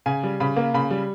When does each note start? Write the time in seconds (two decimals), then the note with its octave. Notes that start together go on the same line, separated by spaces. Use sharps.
0.06 C#3 G#5
0.23 G3
0.40 C#3 B5
0.56 A#3
0.74 C#3 B5
0.91 G3